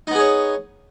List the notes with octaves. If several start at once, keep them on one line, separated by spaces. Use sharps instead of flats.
B3 D#4 G#4 C#5